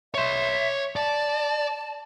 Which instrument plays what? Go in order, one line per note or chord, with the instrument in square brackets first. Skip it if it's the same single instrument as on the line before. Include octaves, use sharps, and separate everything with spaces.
[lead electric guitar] C#5 C6 [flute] E5
[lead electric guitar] D5 [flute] A5